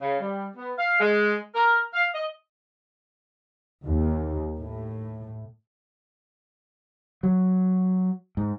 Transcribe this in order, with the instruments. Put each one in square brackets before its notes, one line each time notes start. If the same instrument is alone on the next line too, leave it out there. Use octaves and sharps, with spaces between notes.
[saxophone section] C#3
G3
B3
F5
G#3
A#4
F5
D#5
[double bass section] D#2
A2
[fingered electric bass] F#3
G#2